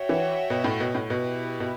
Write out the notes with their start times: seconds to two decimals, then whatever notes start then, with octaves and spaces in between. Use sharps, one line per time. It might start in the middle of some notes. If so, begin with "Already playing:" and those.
Already playing: F#4 C#5 E5 G5
0.09 E3
0.50 B2
0.64 A2
0.80 B2
0.95 A2
1.10 B2 E4 G4 B4
1.60 B2